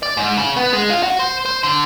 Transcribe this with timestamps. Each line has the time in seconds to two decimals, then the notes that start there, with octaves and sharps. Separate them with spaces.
0.03 D5
0.17 G#2
0.37 C#3
0.57 B3
0.73 G#3
0.90 F4
1.03 F#4
1.20 C5
1.46 C5
1.63 D3